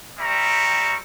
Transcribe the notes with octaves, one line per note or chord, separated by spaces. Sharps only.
G3 C4 E5 A#5 C#6